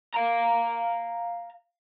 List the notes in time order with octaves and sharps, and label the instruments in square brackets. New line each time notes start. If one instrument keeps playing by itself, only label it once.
[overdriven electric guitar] F5 A#5